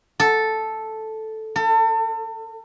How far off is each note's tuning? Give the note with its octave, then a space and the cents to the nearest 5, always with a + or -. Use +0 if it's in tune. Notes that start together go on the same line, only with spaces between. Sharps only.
A4 -5
A4 +35